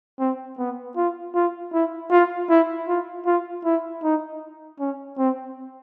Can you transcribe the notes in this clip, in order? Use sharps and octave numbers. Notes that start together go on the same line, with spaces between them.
C4
B3
F4
F4
E4
F4
E4
F4
F4
E4
D#4
C#4
C4